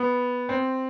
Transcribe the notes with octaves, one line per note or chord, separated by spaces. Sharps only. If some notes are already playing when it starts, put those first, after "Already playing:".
Already playing: B3
C4